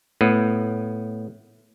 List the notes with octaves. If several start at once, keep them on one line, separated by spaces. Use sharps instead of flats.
A2 B3